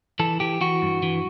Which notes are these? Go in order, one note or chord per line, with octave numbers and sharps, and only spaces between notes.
E3 A4
E3 G4
E3 F#4
G2
E3